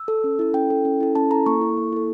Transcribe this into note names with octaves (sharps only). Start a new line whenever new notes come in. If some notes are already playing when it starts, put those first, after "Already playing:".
Already playing: E6
A4
C#4
E4 A4
C#4 G5
E4 A4
C#4
E4 A4
C#4 A5
E4 A4 A#5
A#3 C#6
E4 A4
A#3
E4 A4